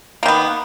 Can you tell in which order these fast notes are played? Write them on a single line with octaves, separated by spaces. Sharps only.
A#3 D#3 B3